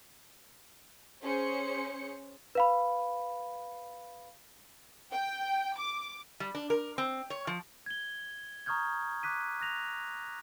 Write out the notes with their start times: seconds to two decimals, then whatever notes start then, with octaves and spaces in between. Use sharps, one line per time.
1.22 C#4 G#4 C5 C#7
2.55 B4 F5 B5
5.12 G5
5.78 D6
6.40 G3
6.55 D4
6.70 A#4
6.98 C4
7.30 C#5
7.47 F3
7.86 G#6 G7
8.66 A#5 C#6 D#6 F6 G6 G#6
9.23 D6 F#6 B6 D#7
9.60 F#6 A#6 F7